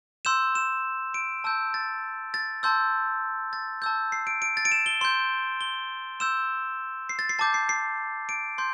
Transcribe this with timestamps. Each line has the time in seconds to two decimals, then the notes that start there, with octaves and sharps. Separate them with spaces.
0.25 C6 E6 G6 E7
0.55 E7
1.14 D7
1.44 A5 E6 G6
1.74 A6
2.34 A6
2.63 A5 C6 E6 G6
3.53 A6
3.82 A5 E6 G6
4.12 C7
4.27 D7
4.42 D7
4.57 A6
4.65 D7
4.72 E7
4.86 G7
5.01 C6 G6 G7
5.61 G7
6.20 C6 E6 G6 E7
7.09 C7
7.19 A6
7.29 C7
7.39 A5 D6 G6 A6
7.54 C7
7.69 C7
8.29 D7
8.58 C6 G6